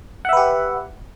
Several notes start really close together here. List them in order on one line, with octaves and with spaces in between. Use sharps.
F#5 E5 B4 G4